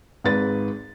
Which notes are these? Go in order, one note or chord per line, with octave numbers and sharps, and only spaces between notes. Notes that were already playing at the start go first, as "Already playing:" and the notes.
G#1 G#2 B4 A6